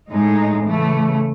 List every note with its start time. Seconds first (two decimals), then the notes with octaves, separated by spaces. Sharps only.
0.11 A2 G#3 D#4
0.66 C#3 E3 A3